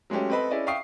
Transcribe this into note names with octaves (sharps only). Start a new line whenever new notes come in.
F#3 G#3 A3 C#4 G4
C4 A4 B4 D#5 B5
C#4 E4 G#4 D5 D#5
E5 F5 G5 C#6 D#6 C7